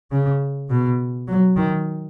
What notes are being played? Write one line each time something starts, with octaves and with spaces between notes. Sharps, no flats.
C#3
B2
F#3
D#3